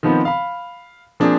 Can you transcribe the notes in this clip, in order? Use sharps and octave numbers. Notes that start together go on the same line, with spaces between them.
D#3 F3 B3 C4
F5 B5
F3 A#3 C4 D4 G#4